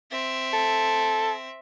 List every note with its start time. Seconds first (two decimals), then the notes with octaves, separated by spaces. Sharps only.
0.11 C4 E5
0.53 A4